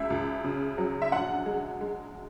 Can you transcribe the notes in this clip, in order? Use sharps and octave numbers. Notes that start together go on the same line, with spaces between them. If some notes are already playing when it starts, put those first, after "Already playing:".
Already playing: C#2 E5
C#2
C#3
F#3
E5
A#1 F#5
G#3
G#3